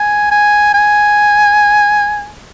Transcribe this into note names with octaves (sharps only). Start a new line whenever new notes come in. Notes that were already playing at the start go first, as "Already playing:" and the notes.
Already playing: G#5
G#5
G#5